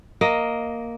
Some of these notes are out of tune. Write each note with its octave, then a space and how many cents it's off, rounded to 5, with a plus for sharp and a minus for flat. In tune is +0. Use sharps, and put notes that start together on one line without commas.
A#3 +0 D#5 +10